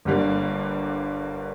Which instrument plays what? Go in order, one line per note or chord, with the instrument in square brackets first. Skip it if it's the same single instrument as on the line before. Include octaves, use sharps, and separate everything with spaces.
[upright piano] G1 G2 D3 G3 A#3